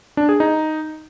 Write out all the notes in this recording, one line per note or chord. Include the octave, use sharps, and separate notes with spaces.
D4
G#4
D#4